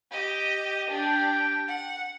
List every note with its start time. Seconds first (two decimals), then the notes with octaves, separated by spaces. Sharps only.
0.11 G4 D#5
0.91 D4 G4 G5
1.68 F#5